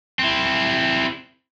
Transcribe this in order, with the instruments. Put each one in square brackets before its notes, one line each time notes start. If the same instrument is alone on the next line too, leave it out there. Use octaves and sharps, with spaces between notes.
[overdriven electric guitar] C4 E4